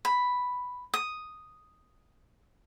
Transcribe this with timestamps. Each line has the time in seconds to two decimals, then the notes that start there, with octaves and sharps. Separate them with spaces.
0.05 B5
0.94 D#6